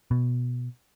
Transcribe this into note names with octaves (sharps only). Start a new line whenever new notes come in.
B2